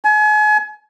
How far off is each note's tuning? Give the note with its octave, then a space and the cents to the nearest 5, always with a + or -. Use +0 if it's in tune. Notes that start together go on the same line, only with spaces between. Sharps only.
G#5 +35